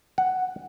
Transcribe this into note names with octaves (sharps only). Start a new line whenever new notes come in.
F#5